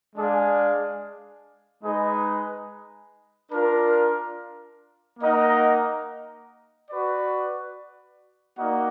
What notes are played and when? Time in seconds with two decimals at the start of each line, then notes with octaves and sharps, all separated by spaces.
0.16 G#3 D4 G#4 D5 F5
1.83 G#3 D#4 G#4 B4 D#5
3.51 D4 F4 A#4
5.20 A#3 D#4 A#4 D#5 F#5
6.87 F#4 B4 D5
8.56 A#3 D#4 F#4 D5 F#5